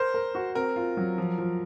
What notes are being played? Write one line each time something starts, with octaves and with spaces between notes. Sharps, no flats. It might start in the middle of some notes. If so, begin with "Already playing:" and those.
Already playing: A#4 C5
A#4
F#4
C4 A#4
F4
F#3
F3
F3